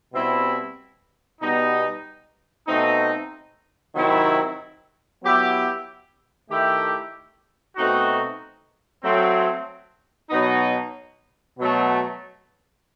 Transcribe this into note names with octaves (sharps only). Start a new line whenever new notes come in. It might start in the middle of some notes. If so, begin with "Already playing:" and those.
B2 G3 C4 E4
B2 G3 B3 D#4
B2 A3 C4 D#4
C3 D#3 F#3 C4 E4
F#3 B3 E4 G4
D#3 A3 E4 G4
B2 A3 C4 D#4 F#4
F#3 A3 C4
B2 F#3 B3 D#4
B2 F#3 A3